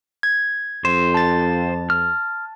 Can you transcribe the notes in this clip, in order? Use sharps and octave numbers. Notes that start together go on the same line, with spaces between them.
G#6
F2 C5
A5 A6
F6